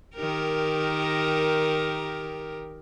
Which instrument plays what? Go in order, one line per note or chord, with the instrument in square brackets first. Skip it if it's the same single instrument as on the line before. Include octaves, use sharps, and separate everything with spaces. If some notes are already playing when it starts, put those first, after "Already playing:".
[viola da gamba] D#3 G4 A#4